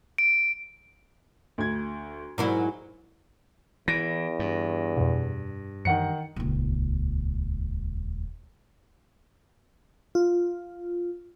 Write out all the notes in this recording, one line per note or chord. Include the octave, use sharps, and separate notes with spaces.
D7
D2 G#6
G#2 F#3 E4 A#4
E2 E3 A#6 D7
G2
F2 B2
F#2 D#3 E3 F#5 C#7
D#1 C#2
F4